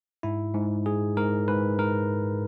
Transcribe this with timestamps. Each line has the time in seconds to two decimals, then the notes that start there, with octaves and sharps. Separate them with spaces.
0.23 G#2 E4
0.54 G#2
0.86 G#2 G#4
1.17 G#2 A#4
1.48 G#2 B4
1.79 G#2 A#4